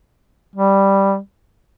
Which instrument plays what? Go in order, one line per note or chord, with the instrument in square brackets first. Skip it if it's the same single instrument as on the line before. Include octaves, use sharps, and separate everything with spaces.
[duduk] G3